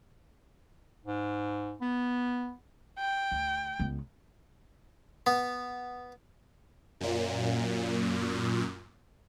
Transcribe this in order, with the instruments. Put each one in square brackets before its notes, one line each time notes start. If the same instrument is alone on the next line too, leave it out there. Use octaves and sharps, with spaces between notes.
[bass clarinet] G#2
B3
[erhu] G5
[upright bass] D2
C#2 B3
[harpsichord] B3
[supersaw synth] F#2 A#2